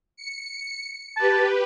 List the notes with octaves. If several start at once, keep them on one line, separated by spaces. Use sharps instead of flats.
C#7
G4 B4 A5